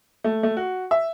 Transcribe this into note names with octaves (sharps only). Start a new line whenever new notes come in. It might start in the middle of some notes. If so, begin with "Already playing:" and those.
A3
A3
F#4
E5